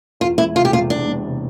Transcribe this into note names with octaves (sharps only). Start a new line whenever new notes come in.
E2 F4
E1 E4
C3 F4
G4
E1 F4
E2 D4
E1
C3